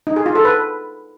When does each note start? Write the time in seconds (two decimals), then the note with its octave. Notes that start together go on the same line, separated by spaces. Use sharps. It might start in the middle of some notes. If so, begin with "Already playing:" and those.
0.07 D#4
0.16 G#4
0.26 F4
0.35 A4
0.45 B4